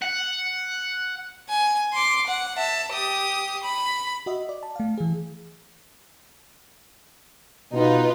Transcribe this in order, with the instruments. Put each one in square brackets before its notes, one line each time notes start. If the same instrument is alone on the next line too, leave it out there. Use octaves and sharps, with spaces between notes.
[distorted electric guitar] F#5
[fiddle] G#5
C6 D6
F#5
E5 A5
G4 D#6
B5
[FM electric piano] F#4 D#5 E5
D5
A5
A3 F5
E3 G#4
[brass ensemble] B2 [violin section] D#4 F4 B4